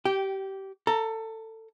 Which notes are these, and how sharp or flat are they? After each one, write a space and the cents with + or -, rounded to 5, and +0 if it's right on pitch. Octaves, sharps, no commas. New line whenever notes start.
G4 -20 G5 +0
A4 +20 A#5 +0